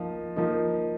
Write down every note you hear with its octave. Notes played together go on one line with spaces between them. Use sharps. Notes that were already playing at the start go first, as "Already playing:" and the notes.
Already playing: F3 A#3 D#4
F3 A#3 D#4